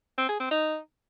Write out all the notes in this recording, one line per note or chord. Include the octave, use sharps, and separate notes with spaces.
C4
G#4
C4
D#4